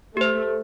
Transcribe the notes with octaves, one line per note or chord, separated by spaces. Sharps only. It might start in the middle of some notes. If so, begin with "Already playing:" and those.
A3 G4 C5